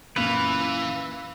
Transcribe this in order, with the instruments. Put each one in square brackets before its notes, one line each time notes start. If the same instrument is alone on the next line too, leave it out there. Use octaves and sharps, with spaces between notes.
[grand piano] F#2 A#2 [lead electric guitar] E3 [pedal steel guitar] B4 F5